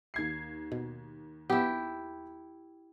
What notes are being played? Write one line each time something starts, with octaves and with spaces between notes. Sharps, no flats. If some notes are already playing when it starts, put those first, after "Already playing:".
D#2 G#6 C7
B2
B3 E4 G4